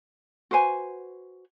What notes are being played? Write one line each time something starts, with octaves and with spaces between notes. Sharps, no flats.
F#4 B4 C5 G#5